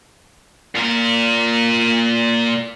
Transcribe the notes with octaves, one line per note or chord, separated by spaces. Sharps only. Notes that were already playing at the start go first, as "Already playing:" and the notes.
A#2 A#4